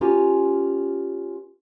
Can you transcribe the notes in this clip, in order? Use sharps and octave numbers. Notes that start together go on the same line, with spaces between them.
C#4 F4 G4 A#4 G#5